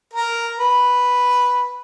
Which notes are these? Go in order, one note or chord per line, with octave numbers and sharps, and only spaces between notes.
A#4
B4